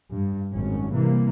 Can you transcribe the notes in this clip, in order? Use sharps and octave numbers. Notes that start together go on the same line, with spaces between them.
G2
G#1 F#2 C#4
C3 E3 G3 A#3